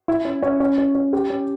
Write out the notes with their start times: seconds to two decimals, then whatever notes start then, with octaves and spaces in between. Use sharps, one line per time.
0.08 E4
0.25 C#4
0.42 C#4
0.60 C#4
0.78 C#4
0.95 C#4
1.13 G4
1.30 C#4